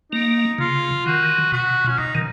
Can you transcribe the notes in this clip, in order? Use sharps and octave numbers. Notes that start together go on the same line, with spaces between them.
A#3 D#4
C#3 F4
D#3 F#4
B2 F#4
C#4
B2 D#4
D#3